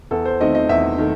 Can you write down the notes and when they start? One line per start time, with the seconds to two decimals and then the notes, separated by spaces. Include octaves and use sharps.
0.11 E2 A4
0.25 C5
0.40 D#3 A3 C4 D#5
0.55 D#5
0.69 E2 E5
0.98 D#3 A3